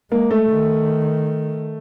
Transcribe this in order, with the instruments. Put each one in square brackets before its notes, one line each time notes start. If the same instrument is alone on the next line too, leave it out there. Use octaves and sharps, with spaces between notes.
[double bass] G#3 [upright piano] A#3
[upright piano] A3
[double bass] D#3